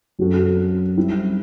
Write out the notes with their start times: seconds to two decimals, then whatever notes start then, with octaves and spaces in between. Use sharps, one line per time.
0.19 F#2 F#3 C4 F#4 A4
0.97 G3 C4 E4